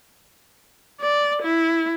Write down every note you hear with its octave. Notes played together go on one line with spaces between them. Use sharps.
D5
E4